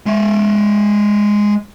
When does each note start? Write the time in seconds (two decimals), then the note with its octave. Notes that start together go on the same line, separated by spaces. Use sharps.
0.06 G#3 E5